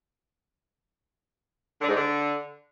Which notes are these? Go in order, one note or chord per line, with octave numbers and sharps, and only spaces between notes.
D3
G#2
D3